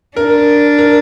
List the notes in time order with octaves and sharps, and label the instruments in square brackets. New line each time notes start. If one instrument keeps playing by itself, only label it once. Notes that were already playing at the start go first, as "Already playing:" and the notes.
[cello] D4 [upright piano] A#4
[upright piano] A#4